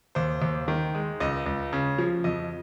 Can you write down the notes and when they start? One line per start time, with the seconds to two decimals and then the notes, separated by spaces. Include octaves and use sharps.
0.15 D#2 C5
0.42 D#2
0.68 D#3
0.95 G#3
1.20 C#2 D#5
1.46 C#2
1.73 C#3
1.98 F3
2.24 F2 D#5